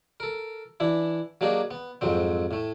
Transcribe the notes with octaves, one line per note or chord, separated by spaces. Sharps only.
A4 A#4
E3 D4 E4
F#3 A#3 D4 G4 G#4 D#5
B3
F2 G#2 F#3 C4
A2 A3